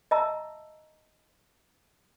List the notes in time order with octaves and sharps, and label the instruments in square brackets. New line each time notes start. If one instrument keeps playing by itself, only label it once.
[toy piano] D#5 E5 A5 A#5 E6